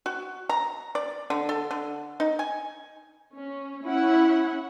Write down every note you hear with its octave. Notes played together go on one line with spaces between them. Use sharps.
F#4
A#5
D5
D3
A4
D3
D#4
G#5
C#4
C#4 E4 F#5